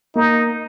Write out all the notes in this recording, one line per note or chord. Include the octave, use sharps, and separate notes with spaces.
A#3 D#4